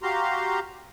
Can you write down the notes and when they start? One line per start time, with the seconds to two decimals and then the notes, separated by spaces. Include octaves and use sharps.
0.03 F#4 G4 F5 A#5 C6